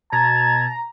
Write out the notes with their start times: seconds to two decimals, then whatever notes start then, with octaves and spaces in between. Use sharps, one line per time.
0.12 B2 A5 A#5 G#6